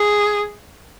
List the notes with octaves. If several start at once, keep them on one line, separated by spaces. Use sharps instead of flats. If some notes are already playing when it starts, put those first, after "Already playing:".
Already playing: G#4